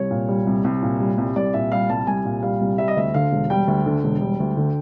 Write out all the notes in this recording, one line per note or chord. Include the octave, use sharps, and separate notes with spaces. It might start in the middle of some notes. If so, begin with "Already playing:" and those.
Already playing: C2 C#5
A#2
G3
C2
C2
A#2
G3
C2
C2 D5
A#2 E5
G3 F5
C2 A5
C2 G#5
A#2
G3 F5
C2
G3 E5
D#5
D2 E5
D3 F5
E1
G3 G5
D2
D3
E1
G3
D2
D3